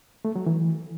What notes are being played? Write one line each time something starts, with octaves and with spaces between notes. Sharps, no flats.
A3
F#3
E3